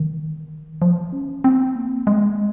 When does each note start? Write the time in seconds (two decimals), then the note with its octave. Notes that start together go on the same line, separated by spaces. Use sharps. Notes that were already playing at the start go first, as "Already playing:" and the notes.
Already playing: D#3
0.82 F3
1.13 C#4
1.44 C4
1.75 A#3
2.07 G#3